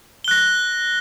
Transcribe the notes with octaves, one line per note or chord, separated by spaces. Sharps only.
F#6 A#6 G7